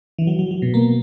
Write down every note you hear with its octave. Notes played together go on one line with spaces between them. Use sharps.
E3
F#3
F#3
F#3
B2
A#3